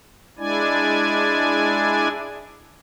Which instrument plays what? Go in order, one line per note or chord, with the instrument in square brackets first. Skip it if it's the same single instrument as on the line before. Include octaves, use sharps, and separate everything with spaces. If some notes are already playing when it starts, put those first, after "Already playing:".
[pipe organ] G#3 D4 E4 D5 G#5